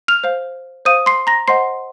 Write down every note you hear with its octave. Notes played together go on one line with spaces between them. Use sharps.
F6 F7
C5 F5
C5 F5 D#6 D#7
C6 C7
A#5 A#6
C5 D#5 F#5 C6 C7